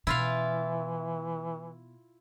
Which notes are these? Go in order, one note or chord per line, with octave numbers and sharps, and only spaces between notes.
B2 E3 E4 F4 F5